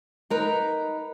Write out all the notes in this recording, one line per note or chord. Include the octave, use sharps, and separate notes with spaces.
D#4 A#4 B4